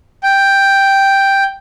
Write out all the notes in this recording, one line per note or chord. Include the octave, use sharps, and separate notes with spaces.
G5